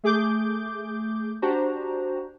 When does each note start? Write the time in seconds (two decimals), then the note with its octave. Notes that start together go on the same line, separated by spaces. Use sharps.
0.04 A3 G#4 D6 G6
1.42 D4 F#4 G4 C5 A#5